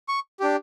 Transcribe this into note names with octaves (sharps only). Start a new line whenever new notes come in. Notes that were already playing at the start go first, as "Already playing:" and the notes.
C#6
D4 G4